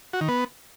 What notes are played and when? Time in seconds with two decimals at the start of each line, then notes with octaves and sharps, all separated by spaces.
0.13 F#4
0.21 D#3
0.28 B3